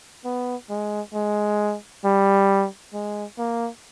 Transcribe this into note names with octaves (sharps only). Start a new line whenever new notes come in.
B3
G#3
G#3
G3
G#3
A#3